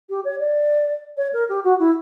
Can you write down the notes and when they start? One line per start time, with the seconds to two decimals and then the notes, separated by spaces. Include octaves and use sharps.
0.10 G4
0.25 C#5
0.40 D5
1.17 C#5
1.33 A#4
1.49 G4
1.64 F#4
1.79 E4